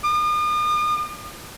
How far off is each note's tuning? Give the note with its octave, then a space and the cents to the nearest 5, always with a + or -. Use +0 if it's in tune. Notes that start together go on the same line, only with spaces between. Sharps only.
D#6 -45